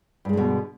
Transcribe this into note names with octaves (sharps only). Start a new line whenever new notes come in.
G2 B2 D3 G#3